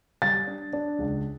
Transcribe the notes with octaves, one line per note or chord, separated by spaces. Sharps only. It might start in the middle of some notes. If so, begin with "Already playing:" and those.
G3 A6
D4
D4
C#2